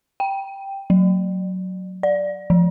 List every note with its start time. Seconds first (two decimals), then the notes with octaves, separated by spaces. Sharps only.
0.20 G5
0.90 F#3
2.03 D5
2.50 F3